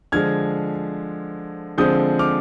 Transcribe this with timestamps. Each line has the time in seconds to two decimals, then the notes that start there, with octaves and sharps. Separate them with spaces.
0.12 D3 F3 G#3 F6 G#6
1.78 D3 F3 G#3 C4 D#6 G6
2.19 D6 F6